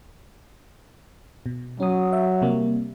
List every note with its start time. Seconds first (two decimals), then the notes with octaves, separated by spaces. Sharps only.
1.46 B2
1.80 F#3 C#4 D#6
2.13 E5
2.42 C3 G3 A#3